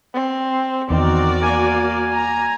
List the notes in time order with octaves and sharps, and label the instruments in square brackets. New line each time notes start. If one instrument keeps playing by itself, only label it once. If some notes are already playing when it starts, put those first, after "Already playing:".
[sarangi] C4
[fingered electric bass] E2 [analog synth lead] D#3 [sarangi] C4 [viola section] F#4 A#4 D5
[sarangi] A#3 [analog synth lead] G#5
[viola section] A#5